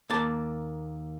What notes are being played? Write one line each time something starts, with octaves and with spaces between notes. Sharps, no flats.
D#2 A#3 A5